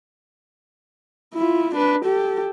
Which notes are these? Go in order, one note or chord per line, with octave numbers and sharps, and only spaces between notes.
E4 F4
D4 B4
G4 A4